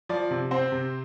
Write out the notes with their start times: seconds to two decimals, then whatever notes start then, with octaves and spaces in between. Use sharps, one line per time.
0.09 F3 D5
0.31 C3
0.51 C4 C5
0.72 C3